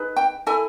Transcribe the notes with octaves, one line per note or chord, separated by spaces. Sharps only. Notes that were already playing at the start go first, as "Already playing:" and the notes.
Already playing: D#4 G#4 B4
G5
E4 A4 G#5